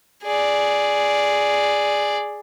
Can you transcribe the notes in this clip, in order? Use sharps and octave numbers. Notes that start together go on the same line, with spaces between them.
G#4 D5